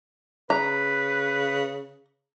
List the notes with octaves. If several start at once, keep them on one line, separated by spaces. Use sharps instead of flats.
C#3 B4 A#5